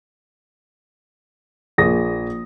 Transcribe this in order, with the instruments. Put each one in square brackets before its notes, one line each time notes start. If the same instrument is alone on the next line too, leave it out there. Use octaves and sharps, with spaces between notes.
[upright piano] A#1 G#4 D#6 A#6